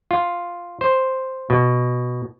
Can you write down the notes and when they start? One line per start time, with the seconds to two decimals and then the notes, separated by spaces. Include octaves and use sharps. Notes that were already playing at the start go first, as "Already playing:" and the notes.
0.11 F4
0.81 C5
1.50 B2